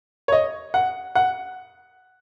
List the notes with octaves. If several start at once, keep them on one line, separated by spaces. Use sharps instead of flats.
C#5
D#5
F#5
F#5